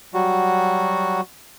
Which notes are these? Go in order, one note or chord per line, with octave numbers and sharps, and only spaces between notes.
F#3 G3 F#4